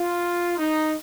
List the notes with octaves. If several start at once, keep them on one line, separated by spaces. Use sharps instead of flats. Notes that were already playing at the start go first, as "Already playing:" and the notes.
Already playing: F4
D#4